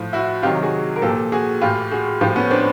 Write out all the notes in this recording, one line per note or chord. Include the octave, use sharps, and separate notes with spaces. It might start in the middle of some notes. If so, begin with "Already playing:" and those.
Already playing: A2 F3
E4 F#4
C3 D#3 F#3 F4 G4
F#4 G#4
A#4
A#2 F3 G4 A4
F#4 G#4
A2 E3 F4 G4
F#4 G#4
A2 F3 F4 G4
B3 C#4
C4 D4